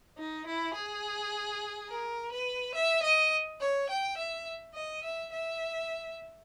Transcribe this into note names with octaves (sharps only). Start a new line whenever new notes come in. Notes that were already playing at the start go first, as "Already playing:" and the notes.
D#4
E4
G#4
A#4
B4
E5
D#5
C#5
G5
E5
D#5
E5
E5